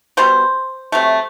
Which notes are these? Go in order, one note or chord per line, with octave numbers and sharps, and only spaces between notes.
B2 G3 B3 C5
C3 F#3 A3